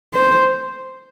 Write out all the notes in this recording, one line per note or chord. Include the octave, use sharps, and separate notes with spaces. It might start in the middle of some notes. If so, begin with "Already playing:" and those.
C5